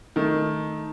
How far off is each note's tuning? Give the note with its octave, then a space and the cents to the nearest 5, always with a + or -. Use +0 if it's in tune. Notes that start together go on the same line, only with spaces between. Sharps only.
D#3 +0 A3 +0 A4 -5